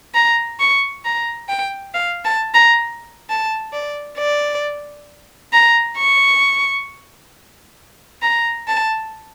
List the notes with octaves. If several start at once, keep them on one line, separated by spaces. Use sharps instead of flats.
A#5
C#6
A#5
G5
F5
A5
A#5
A5
D5
D5
A#5
C#6
A#5
A5